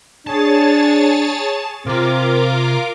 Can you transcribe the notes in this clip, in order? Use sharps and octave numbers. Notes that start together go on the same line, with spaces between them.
D4 G#4 C#5 A5 A6
C3 C4 F4 A#4 C5 D6